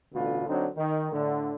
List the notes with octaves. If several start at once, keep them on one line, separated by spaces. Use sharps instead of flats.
A1 D2 B2 D3 F4
D3 F#3 C4 D4 D#4
D#3
A2 D3